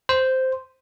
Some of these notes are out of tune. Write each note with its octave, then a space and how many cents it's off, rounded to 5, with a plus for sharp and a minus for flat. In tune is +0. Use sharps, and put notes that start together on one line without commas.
C5 -5